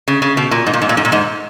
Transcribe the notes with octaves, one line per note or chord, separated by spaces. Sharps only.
C#3
C#3
B2
A#2
G#2
A#2
G#2
A#2
G#2
A#2
G#2